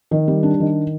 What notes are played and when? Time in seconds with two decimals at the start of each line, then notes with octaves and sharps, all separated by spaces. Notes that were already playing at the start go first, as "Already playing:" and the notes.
0.11 D#3
0.28 G3
0.43 D4
0.60 D#3